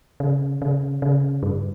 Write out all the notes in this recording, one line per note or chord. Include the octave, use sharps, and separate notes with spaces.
C#3
C#3
C#3
G2